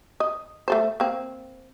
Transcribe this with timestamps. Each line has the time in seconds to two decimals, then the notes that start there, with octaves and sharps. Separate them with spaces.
0.20 D#5
0.68 A3 A4 C5
1.00 A#3 C4